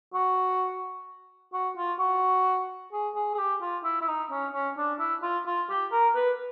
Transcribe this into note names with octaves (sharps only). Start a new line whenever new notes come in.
F#4
F#4
F4
F#4
G#4
G#4
G#4
G4
F4
E4
E4
D#4
C#4
C#4
D4
E4
F4
F4
G4
A#4
B4